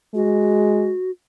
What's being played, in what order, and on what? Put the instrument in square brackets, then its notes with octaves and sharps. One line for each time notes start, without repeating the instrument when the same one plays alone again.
[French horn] G#3 [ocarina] F#4